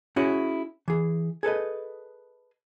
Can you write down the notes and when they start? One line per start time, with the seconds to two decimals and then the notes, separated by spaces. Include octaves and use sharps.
0.16 C#4 E4 F#4 G#4
0.88 E3 G#4
1.43 G#4 A4 B4 D#5